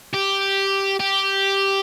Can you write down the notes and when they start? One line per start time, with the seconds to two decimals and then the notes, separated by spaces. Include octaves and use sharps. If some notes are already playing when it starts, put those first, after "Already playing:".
0.14 G4
1.00 G4